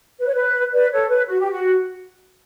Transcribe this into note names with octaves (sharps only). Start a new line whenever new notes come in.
B4
C#5
B4
B4 D5
A4 C#5
B4
F#4
G4
F#4